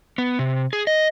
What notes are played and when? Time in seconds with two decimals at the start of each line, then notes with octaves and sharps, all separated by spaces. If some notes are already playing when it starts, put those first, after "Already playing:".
0.18 B3
0.39 C3
0.73 G#4
0.87 D#5